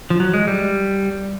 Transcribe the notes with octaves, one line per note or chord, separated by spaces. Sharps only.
F3
F#3
G#3
G3